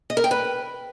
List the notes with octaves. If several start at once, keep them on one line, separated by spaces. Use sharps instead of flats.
D#5
A#4
G5
B4